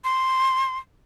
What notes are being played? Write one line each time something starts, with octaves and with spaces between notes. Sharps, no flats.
C6